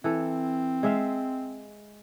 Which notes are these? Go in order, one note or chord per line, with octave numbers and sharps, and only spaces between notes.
E3 C4 A4
G#3 E5 F5